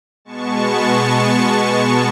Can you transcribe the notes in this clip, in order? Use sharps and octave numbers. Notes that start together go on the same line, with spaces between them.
B2 G#3 B3 A5 C#6